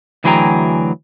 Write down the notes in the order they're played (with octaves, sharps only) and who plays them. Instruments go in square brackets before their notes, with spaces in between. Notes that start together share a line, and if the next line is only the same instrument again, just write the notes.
[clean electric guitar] D2 E3 F#3 G#4 G5 A#5